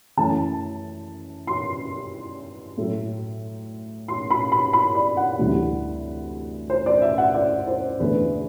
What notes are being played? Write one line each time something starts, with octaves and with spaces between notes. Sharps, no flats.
F#2 E3 A3 A5
C6
A2 F#3 A3
C6
B5
B5
B5
D5
F#5
D2 C3 E3 G3
C5
D5
E5
F#5
D5
C5
E2 D3 A3 B4